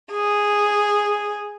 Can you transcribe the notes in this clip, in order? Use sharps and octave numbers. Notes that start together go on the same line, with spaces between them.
G#4